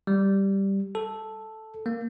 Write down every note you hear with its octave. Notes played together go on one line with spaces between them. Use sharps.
G3
A4
A#3